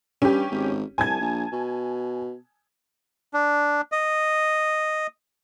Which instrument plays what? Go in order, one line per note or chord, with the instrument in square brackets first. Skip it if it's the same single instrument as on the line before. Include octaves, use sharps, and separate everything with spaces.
[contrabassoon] G2 [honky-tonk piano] C#4 G4
[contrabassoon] G#1
[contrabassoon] C2 [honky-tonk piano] G#5 A5 G#6
[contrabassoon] A#1
B2
[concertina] D4
D#5